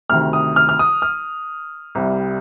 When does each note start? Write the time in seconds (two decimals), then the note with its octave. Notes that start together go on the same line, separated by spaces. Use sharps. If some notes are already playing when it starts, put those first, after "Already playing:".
0.10 D2 C3 D#3 F6
0.33 D#6
0.56 F6
0.69 F6
0.79 D#6
1.02 F6
1.95 C2 C3 G3